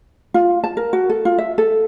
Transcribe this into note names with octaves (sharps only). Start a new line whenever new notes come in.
F4
A5
A#4
F#4
A4
F4
E5
A4